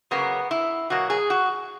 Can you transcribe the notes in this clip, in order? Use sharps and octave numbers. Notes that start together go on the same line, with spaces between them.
C#3 F#3 A#3 B3
E4
B2 F#3 A#3 F#4
G#4
F#4